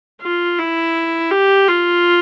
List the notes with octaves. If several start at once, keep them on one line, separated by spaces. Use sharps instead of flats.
F4
E4
G4
F4